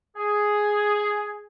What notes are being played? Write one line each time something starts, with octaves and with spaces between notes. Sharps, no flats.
G#4